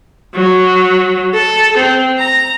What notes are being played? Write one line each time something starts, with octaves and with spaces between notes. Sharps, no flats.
F#3
A4
C4
A#5